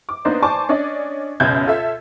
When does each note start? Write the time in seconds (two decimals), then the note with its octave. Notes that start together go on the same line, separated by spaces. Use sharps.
0.09 D6
0.25 A#3 B3 D4 D#4 B4 C5
0.42 C5 D5 G#5 A5 C#6 D6
0.69 C#4 D4 D5 D#5
1.40 C#2 F#2 B2 E5 G6 G#6
1.66 F4 A4 E5